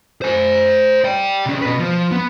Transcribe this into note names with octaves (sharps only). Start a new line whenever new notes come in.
C5 G#5
D5 G5
C3 C#4
B2 B4
F3
B3